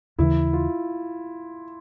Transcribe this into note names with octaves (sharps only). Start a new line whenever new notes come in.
D#2 C#3 E3 E4
F4